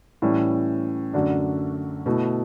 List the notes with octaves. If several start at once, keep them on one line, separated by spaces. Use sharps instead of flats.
A2 E3 G3 C#4
F#2 D3 A3 D4 F#4
B2 A3 E4